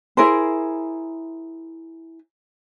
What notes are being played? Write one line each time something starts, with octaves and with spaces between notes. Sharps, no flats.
E4 G#4 A#4 C5